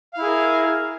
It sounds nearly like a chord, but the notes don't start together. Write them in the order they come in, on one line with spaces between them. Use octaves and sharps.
F5 E4 G#4 A#4